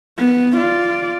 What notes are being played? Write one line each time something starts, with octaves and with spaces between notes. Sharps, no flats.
B3
F4 D5